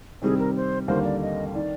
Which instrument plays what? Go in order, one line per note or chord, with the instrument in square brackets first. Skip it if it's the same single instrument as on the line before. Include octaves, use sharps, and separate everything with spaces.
[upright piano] C3 D#3 G3 C4 [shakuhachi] G#4
[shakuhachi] A#4
C5
[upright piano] D#2 D3 G3 A#3 [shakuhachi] C5
[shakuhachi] D5
D#5
[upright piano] D#3 [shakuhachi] D5